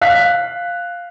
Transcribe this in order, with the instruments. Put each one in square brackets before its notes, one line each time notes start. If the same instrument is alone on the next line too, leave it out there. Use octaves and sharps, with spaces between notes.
[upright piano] F5 F#6 B6